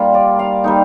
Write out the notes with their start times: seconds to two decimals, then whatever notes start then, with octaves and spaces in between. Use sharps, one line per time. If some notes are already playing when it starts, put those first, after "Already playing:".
Already playing: G3 A#3 F4
0.14 D5
0.39 F5
0.64 G3 A#3 D#4